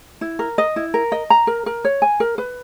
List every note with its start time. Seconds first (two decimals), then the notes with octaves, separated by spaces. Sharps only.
0.21 E4
0.39 A#4
0.58 D#5
0.76 E4
0.94 A#4
1.12 D#5
1.30 A#5
1.47 A#4
1.66 A#4
1.85 C#5
2.02 G#5
2.20 A#4
2.38 B4